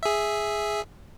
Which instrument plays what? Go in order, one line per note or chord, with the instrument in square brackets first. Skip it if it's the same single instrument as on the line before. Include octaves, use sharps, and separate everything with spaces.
[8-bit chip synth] G#4 E5